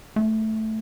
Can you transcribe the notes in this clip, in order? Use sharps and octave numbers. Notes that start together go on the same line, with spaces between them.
A3